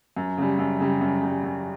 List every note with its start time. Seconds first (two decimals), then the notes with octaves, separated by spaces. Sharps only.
0.17 F#2
0.38 C#3 G3
0.59 F#2
0.80 C#3 G3
1.01 F#2
1.21 C#3 G3
1.44 F#2